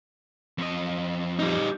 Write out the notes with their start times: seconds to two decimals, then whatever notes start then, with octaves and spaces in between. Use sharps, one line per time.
0.58 F2 D#5
1.39 G3 D#4